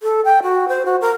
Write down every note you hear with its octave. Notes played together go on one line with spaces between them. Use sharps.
A4
G5
F#4
C5
F#4
A#4